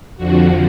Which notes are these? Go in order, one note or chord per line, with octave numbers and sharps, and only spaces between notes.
F2 D3 F3 F#4